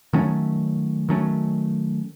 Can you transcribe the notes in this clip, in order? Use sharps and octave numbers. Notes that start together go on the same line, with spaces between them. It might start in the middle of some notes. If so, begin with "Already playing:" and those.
D#3 F#3 A3 C#4
D#3 F#3 A3 C#4